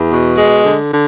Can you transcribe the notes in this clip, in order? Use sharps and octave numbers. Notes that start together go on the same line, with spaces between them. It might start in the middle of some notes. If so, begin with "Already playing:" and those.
Already playing: E2
B2
G#3
D3
D3